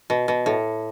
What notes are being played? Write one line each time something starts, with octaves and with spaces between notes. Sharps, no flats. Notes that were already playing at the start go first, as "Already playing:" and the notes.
B2
B2
A2